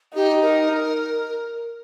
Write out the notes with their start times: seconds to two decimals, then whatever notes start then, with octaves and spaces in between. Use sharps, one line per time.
0.15 D#4 G4
0.42 A#4